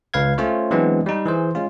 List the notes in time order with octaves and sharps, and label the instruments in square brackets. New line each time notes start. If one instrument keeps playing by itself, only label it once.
[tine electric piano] C#2 B4 F5 G#6
A3 C#4 F4 C5 C#5
E3 F#3 G#3 B3 C4 D4
G3 D#4
E3 G#4 C5
G#3 C#4 F4